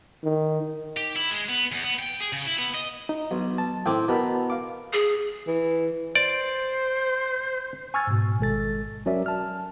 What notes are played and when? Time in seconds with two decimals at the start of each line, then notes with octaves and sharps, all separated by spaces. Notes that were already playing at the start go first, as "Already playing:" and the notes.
0.24 D#3
0.97 G4
1.16 E4
1.31 G#3
1.49 B3
1.72 E2
1.84 B3
1.99 G5
2.20 G#4
2.33 C#3
2.46 E4
2.58 B3
2.74 D#5
3.09 D#4
3.31 B1
3.58 A5
3.86 A2 C4 G5 D6
4.09 B2 A#4 A5 B5
4.50 F5 D6
4.93 G#4
5.47 E3
6.15 C5 D5
7.94 G#5 C#6 E6 F6 G#6 A6
8.07 G#2 B2
8.39 G#1 G#3 A4 A6
9.06 F#3 C#4 F#4 A#4 D5 E5
9.26 A5 F6